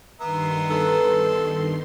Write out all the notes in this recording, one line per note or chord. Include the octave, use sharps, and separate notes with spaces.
G2 D#3 B3 E5 A#5 C6
B2 A4